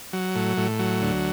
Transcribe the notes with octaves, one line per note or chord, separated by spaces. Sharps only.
F#3
A2
A2
F#3
D2